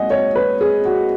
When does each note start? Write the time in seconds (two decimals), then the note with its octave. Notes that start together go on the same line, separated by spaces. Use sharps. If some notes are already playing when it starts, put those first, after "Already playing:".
Already playing: G#2 F#3 A#3 D#5 F#5 G#5
0.10 C#5
0.35 B4
0.61 G#4
0.85 F#4